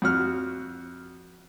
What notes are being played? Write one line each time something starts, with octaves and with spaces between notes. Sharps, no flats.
F2 F#4 F6